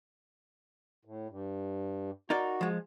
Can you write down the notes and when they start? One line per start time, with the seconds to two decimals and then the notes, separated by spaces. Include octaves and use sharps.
1.05 A2
1.29 G2
2.30 D#4 F#4 A#4 D5
2.61 F3 G#3